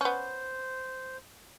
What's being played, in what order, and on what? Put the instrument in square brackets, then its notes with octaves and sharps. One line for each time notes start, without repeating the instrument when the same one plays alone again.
[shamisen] B3 C#4 [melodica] C5